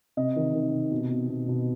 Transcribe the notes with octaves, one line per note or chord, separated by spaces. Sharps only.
C3 D#5
D#3
D#3
C3
B2
B2
B2
B2